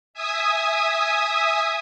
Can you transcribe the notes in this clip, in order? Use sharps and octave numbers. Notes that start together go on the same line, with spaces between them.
E5 G#5 D#6